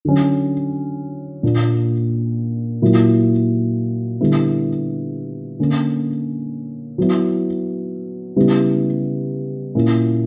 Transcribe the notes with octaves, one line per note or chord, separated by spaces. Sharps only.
D3 F#3 C#4
A#2 A#3 D4
A#2 F#3 A#3 E4
D3 G3 B3 E4
D3 A#3 C#4
F#3 B3 E4
C#3 G3 B3 E4
A#2 A#3 C#4 E4